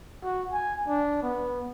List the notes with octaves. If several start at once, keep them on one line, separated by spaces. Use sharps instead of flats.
F#4
G#5
D4
B3